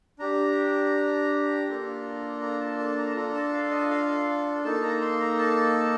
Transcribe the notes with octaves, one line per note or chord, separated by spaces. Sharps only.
D4 G4 A#5
A#3 D4 F4 A4
A#5
A5
A5
A#5
A5
D4 F4 A4 A#5
A5
F5
D#5
F5
A#3 D#4 A4 A5
A#5
C6
A#5
A5